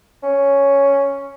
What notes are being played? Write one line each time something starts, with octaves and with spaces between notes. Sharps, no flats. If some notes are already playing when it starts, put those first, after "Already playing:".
C#4